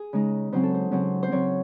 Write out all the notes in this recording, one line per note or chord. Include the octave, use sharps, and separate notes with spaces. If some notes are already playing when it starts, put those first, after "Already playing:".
Already playing: G#4
C#3 G#3 D#4
C#3 F#3 C4 C5
A4
C5
C#3 F#3 C4
C5
C#3 F#3 C4 C#5